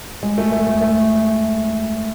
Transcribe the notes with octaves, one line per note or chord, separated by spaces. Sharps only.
G#3
A3
A3
A3
A3